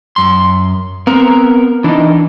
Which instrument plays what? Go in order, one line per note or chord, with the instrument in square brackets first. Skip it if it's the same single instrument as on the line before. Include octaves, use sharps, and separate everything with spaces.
[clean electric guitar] F#2 C6
[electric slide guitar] B3 A#4 [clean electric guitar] C4
[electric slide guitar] E3 D#4 [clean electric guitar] D4